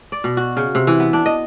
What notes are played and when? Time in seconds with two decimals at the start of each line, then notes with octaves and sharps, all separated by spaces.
0.12 D5
0.24 B2
0.37 F#4
0.57 C#3
0.75 C3
0.87 E3
1.00 B3
1.13 D4
1.26 D#5